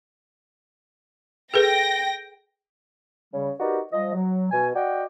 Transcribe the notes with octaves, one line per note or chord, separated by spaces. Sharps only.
G#4 A4 B4 G5 A#6
C#3 G3
D#4 F#4 G4 A#4 B4 D5
F3 G3 D#5
F#3
B2 G#5
F#4 D5 D#5 F#5 G5